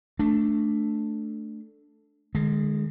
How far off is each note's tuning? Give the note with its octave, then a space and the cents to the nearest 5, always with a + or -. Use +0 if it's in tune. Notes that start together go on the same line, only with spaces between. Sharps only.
A3 +0 D4 +0
D3 +45 G#3 +0